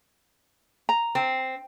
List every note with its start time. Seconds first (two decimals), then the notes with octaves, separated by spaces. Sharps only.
0.89 A#5
1.15 C4